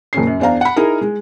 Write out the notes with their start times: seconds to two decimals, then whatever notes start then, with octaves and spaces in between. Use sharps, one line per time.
0.13 F#1 A#2 C#4 C7
0.27 F#2
0.40 E2 D4 C5 F5 A#5
0.61 F#5 B5
0.76 D#4 E4 G#4 A#4
1.01 G#3